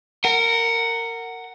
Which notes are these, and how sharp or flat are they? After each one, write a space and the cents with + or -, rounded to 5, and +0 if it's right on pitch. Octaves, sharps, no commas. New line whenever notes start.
A#4 -20 F#5 +5